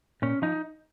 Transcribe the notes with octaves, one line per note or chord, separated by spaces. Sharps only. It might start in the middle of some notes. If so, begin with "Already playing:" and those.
A#2 C#4
F3 D#4